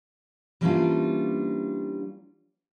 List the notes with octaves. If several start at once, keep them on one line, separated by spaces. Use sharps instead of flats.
E3 G3 A#3 C#4 D4 F4